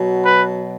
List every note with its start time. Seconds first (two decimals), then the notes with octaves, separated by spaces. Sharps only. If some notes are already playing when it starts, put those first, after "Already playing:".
Already playing: B2 F#3
0.24 B4